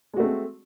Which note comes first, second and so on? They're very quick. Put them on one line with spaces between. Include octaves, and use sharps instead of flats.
G#3 F#4 A3 C4